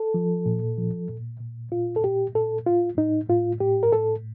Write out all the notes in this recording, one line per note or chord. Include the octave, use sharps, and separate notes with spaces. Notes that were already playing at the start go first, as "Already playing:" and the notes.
Already playing: A4
F3
A#2
F3
A#2
A#2
A#2 F4
A4
A#2 G4
A#2 A4
A2 F4
A2 D#4
A2 F4
A2 G4
A#4
A2 A4